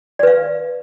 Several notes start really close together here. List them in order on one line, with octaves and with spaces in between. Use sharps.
D5 B4 F5